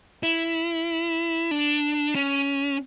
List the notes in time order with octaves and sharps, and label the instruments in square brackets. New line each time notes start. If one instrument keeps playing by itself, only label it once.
[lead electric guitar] E4
D4
C#4